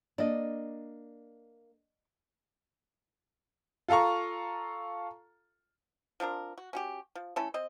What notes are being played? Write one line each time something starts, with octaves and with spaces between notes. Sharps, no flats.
A#3 D4 D5 D#5
F4 A4 F5 A#5 C#6
F3 C4 D4 A#4
F#4
C#4 F#4 G4
F3
A3 C#4 E4 A4
C4 D#5